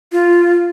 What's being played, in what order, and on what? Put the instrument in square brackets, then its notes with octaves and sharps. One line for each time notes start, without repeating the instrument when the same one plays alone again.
[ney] F4